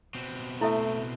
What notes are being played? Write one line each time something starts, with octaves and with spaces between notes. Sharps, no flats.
B2 C4
A3 E4 A4 E5